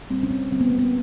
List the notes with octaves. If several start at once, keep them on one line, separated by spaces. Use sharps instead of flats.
A#2 G3 A#3 C4
C#4
C4
D3 G3 A#3 C4
B3
A#3
B3